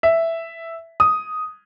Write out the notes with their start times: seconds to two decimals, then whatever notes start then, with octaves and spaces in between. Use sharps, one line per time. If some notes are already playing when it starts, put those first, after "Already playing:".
0.03 E5
1.00 D#6